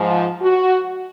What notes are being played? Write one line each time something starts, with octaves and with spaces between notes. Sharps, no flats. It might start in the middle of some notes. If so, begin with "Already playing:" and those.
Already playing: G#2 F3
F#4